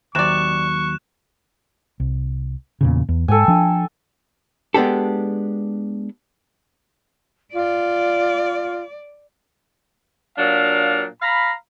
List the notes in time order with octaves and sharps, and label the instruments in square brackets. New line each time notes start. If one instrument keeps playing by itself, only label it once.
[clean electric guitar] D#2 F#3 [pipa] C3 D5 [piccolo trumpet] C#6 [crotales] F#6 E7
[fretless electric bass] C2
E2 A#2 C#3
E2
[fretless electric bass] G#2 [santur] A4 G5 G#5
[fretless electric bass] F3 D4
[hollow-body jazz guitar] G#3 B3 D4 G4 A4
[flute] F4 [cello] D5
[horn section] A#2 F#3 D4 F5
F5 A#5 B5